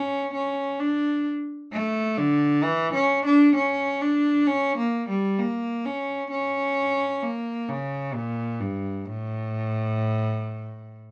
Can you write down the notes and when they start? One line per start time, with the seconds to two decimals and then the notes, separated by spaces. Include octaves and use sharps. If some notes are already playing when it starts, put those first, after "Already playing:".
Already playing: C#4
0.34 C#4
0.80 D4
1.73 A3
2.18 D3
2.63 E3
2.94 C#4
3.26 D4
3.56 C#4
4.01 D4
4.47 C#4
4.78 A#3
5.09 G3
5.39 A#3
5.86 C#4
6.30 C#4
7.23 A#3
7.69 C#3
8.14 A#2
8.60 G2
9.06 A2